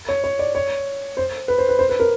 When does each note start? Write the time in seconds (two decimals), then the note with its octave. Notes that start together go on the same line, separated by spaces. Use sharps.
0.09 C#5
0.24 C#5
0.39 D5
0.55 C#5
1.17 C5
1.48 B4
1.58 C5
1.69 B4
1.79 C5
1.89 B4
2.00 A#4